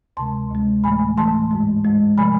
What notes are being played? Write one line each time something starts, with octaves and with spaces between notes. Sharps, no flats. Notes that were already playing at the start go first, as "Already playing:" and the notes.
D2 C3 G#3 A5 C6
D2 C3 G#3
A2 E3 A3 G#5 B5
A2 E3 A3 A5 C6
G#2 G#3
G#2 G#3
C3 F3 A3 G#5 B5